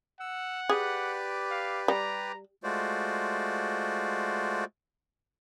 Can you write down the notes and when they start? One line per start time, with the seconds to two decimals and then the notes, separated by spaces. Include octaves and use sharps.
0.20 F#5 E6
0.69 G4 G#4 B4 D5
1.51 F5
1.88 G3 A#5
2.64 G#3 A3 F4 F#4 C5 D5